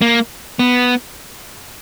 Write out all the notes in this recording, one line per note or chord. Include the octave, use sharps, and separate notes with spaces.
A#3
B3